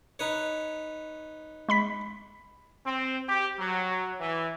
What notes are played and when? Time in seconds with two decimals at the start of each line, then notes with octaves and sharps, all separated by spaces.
0.19 D#4 B4 C#5
1.69 G#3 B5 B6
2.85 C4
3.28 G4
3.58 F#3
4.20 E3